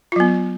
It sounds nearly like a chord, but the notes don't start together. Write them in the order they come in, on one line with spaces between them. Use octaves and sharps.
F4 F#3 B3